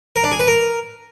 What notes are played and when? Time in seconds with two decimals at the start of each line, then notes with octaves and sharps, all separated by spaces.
0.16 A#4
0.24 D4
0.32 G#4
0.39 B4
0.47 A#4